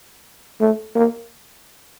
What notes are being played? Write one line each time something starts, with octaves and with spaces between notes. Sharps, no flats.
A3
A#3